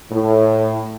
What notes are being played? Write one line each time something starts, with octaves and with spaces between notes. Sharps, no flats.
A2